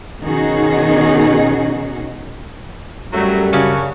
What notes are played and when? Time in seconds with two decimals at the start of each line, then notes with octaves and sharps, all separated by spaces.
0.21 B2 D#3 C#4 D#4 F#4 G#4
3.13 F#2 F#3 G3 A3
3.53 C#3 C#4 D4 F#4